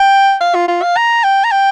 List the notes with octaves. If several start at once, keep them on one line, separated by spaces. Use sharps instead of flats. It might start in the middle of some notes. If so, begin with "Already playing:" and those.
Already playing: G5
F5
F4
F4
F5
A#5
G5
A#5
G5